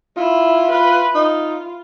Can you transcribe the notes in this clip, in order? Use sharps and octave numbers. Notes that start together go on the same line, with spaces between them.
E4 F4
F4 B4
D#4 F4